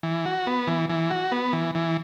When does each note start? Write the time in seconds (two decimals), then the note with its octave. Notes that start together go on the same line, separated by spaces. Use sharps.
0.03 E3
0.26 F#4
0.47 B3
0.67 E3
0.90 E3
1.10 F#4
1.32 B3
1.53 E3
1.75 E3